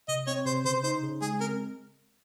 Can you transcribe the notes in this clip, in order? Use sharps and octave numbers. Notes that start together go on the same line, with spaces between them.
C3 D#5
C4 C#5
C3 C5
C#3 C5
D#4 C5
C#3
G#3 G#4
C4 A#4